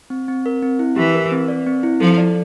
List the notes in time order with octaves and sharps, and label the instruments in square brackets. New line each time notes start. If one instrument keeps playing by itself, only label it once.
[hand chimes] C4
C4
A#4
C4
E4
[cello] E3 [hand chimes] G4
[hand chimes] A#4
C4
D5
C4
E4
[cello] F3 [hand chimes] A4
[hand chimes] D5